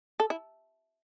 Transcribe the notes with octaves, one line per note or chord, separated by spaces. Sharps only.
A4
E4